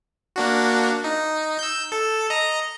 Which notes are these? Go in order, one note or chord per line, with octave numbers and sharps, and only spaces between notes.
A#3 D4 F#4
D#4
E6 G6
A4
D#5 A#5